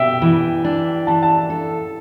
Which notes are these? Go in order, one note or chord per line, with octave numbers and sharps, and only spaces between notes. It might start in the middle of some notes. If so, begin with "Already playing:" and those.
Already playing: B2 G4 E5 G5
E3
D4
E3 A5
A5
A4